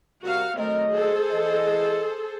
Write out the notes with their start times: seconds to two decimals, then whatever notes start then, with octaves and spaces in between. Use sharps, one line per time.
0.24 C3 G3 F#4 A#4 F5
0.57 D#3 F#3 A3 C4 A#4 D#5
0.90 G#4 A4 C5
1.30 E3 D#5